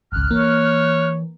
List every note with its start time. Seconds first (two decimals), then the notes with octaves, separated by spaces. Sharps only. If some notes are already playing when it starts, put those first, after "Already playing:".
0.12 G#1 C#2 F6 F#6
0.31 E3 A#3 C#5